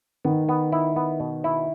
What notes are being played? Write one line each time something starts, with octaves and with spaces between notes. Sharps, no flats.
D#3 B3
B3
E4
B3
B2
E4